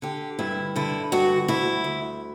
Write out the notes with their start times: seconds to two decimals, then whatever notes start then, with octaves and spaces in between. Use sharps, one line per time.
0.02 D3 G4
0.39 G2 E4
0.76 D3 E4
1.12 G2 F#4
1.48 D2 E4
1.84 D2